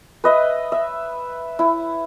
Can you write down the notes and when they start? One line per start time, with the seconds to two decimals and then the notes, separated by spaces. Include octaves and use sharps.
0.24 B4 D#5 E5
0.72 E5
1.59 E4